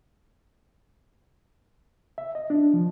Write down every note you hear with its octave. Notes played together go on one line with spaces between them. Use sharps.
E5
D#5
D4
F3